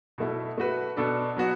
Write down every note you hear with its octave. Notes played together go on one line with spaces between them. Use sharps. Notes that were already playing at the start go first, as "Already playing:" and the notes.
B2 A3 E4
A3 F#4 B4
B2 B3 D4 A4
F#3 B3 F#4